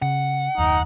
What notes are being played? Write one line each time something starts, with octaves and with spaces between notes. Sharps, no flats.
C#3 F#5
F#1 D#2 D#4